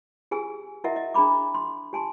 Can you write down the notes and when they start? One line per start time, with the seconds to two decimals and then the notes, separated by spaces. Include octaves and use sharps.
0.31 G4 G#4 G#5 E6
0.84 E4 F#4 A#4 D#5 E5 F#5
0.96 D#5
1.14 D4 G#4 A#5 B5 D6
1.54 C6
1.93 G4 G#5 A5 C6